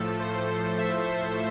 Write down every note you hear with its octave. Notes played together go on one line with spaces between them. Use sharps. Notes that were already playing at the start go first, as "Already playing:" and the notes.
Already playing: A2 F3 A3 A4
C5
C5
E5
C5